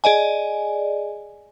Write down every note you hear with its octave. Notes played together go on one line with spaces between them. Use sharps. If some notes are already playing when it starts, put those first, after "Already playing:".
G#4 D5 D#5 G#5